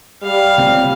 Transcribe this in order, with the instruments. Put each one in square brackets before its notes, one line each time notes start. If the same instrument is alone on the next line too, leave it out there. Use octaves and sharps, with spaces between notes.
[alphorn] G3 [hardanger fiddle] F5
[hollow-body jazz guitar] C#2 C4